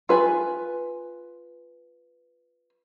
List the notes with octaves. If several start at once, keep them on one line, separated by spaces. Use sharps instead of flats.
F4 B4 G#5